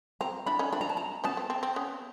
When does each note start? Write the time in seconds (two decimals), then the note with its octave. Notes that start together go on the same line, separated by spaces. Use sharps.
0.21 C4 A#5
0.46 D4 E4 B5
0.59 C#4 D#4
0.72 C4 D4 B5
0.81 A#5
0.89 A5
0.97 A#5
1.24 B3 C#4 A5
1.37 C4
1.50 C4
1.63 C4
1.76 B3 C#4